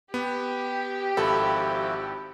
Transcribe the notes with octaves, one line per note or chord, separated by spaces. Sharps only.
B3 G4
G#1 F3 E4 F#4 A4 B5